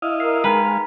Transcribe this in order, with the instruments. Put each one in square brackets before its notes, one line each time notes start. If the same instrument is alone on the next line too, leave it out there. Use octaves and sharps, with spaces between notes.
[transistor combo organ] E4 D#5 F5
[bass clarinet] A#4 [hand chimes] C7
[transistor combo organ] G#3 F5 [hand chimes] D#4 G5 A#5 [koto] B4